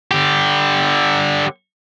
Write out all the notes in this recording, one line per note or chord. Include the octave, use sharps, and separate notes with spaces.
D3 G4